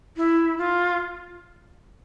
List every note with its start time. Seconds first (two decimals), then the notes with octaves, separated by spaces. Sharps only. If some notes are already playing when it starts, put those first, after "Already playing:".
0.17 E4
0.58 F4